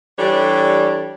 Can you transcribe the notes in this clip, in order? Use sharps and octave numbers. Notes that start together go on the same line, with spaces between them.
E3 G3 D4 G4 A4 C#5